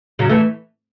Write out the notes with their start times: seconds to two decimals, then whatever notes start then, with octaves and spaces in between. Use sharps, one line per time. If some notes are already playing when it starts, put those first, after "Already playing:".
0.19 C#3 F#3
0.29 E3 A3